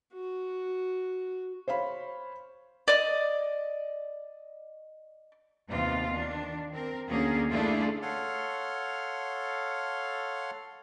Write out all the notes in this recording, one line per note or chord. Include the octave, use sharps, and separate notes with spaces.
F#4
C5 C#5 F5 B5
D5 D#5
D#2 C3 B3 F4
D#3 D4
C4 A#4
D2 D3 A#3 C#4 G#4 A#4
A3 D4 E4 F4 G#4 A4
A4 C#5 F5 F#5 C6 F6